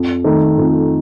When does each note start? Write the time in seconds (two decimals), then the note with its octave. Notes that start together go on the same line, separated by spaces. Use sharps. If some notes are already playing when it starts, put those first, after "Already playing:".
Already playing: F2
0.24 D#3 A3 D#4 A4
0.58 F2